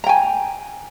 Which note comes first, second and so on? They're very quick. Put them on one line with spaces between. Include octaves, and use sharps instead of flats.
A#5 G5 G#5